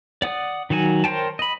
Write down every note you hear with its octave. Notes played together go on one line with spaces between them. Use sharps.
D5 F#5 D#6
D#3 F#3 F#4 G#5
A#4 C5 C#5 G5 A5
D#5 B5